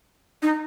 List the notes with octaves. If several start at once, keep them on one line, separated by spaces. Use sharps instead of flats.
D#4